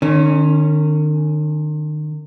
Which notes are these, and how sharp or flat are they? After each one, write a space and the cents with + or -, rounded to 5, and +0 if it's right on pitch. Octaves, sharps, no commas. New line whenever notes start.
D#3 -40 C#4 +0